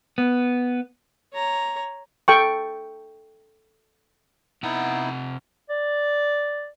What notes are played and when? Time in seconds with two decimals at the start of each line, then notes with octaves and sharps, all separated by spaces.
0.18 B3
1.33 C#5 A#5
2.28 A4 G5 C#6
4.63 C3 B3 D#4 E4 F#5
5.69 D5